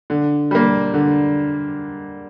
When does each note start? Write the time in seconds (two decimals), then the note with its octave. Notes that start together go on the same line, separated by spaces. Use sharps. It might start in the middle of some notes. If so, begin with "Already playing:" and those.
0.10 D3
0.51 G3 A#3
0.94 D3